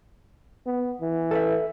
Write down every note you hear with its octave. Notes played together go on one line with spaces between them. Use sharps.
B3
E3
A4 B4 E5